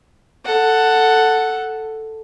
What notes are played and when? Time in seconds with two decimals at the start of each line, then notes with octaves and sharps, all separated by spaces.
0.46 A4 F#5